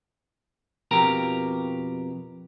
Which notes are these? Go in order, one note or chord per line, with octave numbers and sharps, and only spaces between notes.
F2 B2 G4 A#4 A#5